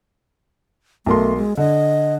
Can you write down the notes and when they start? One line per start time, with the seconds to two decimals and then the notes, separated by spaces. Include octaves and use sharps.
1.06 B1 A3 A#4 C6
1.37 G#3
1.57 D3 D#5